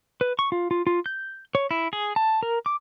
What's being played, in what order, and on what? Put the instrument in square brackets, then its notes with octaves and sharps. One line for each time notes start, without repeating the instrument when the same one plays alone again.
[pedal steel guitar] B4
C#6
F4
F4
F4
G6
C#5
E4
G#4
A5
A#4
D6